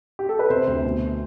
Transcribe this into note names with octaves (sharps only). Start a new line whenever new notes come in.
G4
A4
B4
C3 C5
D2
B2